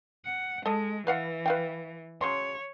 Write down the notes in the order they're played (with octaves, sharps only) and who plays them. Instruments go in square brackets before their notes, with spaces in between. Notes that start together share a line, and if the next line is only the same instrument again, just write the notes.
[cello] F#5
[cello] G#3 [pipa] A4 D#5
[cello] E3 [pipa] B4 F5 F#5
[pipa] B4 F5 G5
[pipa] C#3 F#3 C6 [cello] C#5